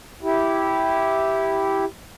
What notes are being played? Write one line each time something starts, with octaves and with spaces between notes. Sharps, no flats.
E4 G4